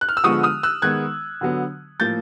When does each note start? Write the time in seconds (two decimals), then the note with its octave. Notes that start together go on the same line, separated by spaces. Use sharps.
0.01 F#6
0.09 F6
0.17 E6
0.24 D3 F3 G#3 B3 C#6 D#6
0.43 D#6 F6
0.63 E6 F#6
0.82 D#3 G#3 B3 F#6 G#6
1.41 D3 F#3 B3
2.00 A2 F3 A#3 G6 A6